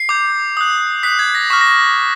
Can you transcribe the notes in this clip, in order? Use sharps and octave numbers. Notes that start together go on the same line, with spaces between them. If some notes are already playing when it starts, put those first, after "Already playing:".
Already playing: C7
D6 G6
D#6 F#6
D#6 F#6 B6
G#6
A#6
C#6 F6 B6
A#6